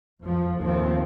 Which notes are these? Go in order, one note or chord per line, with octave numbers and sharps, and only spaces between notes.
F2 F3
D#2 A2 F3 C4